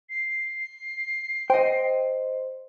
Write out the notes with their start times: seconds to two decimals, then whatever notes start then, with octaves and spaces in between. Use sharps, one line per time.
0.10 C7
1.50 C5 D#5 G5